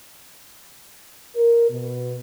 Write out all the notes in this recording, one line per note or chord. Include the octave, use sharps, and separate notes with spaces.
A#4
B2